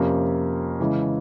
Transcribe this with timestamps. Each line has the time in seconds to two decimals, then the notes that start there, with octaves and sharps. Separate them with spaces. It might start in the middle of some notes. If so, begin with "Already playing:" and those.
Already playing: F2 C3 F3 A#3 C#4
0.80 C#3 E3 G#3